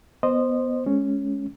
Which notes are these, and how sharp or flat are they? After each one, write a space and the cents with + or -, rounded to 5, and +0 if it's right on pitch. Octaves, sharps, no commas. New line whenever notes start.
B3 +0 C5 +0 D#5 -20
G#3 +20 C#4 +0